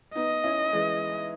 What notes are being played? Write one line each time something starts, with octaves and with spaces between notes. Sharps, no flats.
B3 D#4 D#5
C#4 E4
E3 G#3